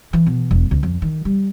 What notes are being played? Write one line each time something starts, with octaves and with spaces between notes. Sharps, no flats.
E3
B2
E1
C#2
F2
D#3
G3